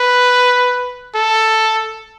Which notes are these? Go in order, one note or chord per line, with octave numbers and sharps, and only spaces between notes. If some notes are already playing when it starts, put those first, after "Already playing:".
Already playing: B4
A4